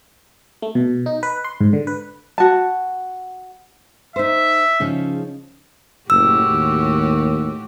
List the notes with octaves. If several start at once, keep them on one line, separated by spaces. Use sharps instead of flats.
A3
B2
D#4
B4
C6
G#2
D3
B4
F#4 A5
D#4 C5 E5
C#3 F3 C#4 D#4
F#1 A2 F#4 G4 E6
D#2